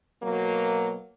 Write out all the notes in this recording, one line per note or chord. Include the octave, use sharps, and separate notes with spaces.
B2 F#3 A#3